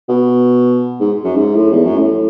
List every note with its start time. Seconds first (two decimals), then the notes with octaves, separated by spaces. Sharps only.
0.09 B2
1.01 G#2
1.25 F#2
1.36 G#2
1.56 A2
1.73 E2
1.85 F#2
1.98 A2